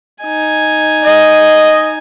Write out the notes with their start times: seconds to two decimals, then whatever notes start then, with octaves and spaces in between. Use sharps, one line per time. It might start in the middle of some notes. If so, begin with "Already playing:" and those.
0.22 D#4 G#5
1.03 D#5